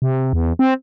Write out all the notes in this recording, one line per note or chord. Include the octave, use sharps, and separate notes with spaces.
C3
E2
C4